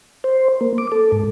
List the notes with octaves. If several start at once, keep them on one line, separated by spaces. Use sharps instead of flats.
C5
A#3
D6
A4
G#2